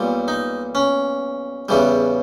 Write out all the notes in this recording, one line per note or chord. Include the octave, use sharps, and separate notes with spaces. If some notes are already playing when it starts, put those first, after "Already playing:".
Already playing: B1 A#2 G3
D#4
C#4
E2 C#3 E3 G3